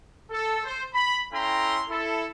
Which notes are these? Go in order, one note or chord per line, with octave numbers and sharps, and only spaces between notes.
A4
C5
B5
C#4 E4 A4 G5 A#5 C6
E4 A4